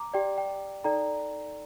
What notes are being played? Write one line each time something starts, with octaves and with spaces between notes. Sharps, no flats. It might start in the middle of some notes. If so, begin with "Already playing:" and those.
Already playing: A#5 D6
G4 D5 G5
G5
D#4 A4 D5 G5 A#5